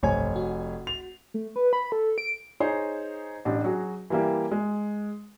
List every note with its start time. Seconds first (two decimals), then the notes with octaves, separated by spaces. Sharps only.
0.03 F1 B1 G2 C5 C#5 G#5
0.36 F#4
0.87 F7
1.34 A3
1.56 B4
1.73 B5
1.92 A4
2.18 D7
2.60 D#4 G#4 C5 C#5
3.45 A1 D4 G4
3.64 F#3 F#4 G#4
4.10 E3 G3 A#3 E4 G4
4.51 G#3